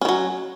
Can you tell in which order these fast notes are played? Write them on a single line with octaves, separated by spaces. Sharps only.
C#4 D#3 F#3